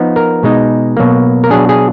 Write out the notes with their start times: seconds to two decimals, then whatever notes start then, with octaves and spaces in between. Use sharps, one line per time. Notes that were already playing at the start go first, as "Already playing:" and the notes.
Already playing: F3 B3 D#4
0.16 A#4
0.43 B2 G#3 D#4
0.97 B2 F#3 A#3
1.44 A#4
1.50 B2 F#3 D4 G#4
1.69 G#4